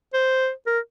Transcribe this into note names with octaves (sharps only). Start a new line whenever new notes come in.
C5
A#4